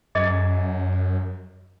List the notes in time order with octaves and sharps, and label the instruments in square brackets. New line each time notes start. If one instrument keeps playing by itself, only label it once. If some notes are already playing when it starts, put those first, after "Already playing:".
[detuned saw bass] F#2 [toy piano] G#4 D5 D#5